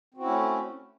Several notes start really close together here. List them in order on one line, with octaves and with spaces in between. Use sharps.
C4 F#4 E4 C#4 A3